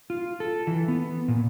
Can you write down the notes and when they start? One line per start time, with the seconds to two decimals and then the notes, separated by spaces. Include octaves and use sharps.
0.10 F4
0.40 A4
0.67 E3
0.88 B3
1.28 A#2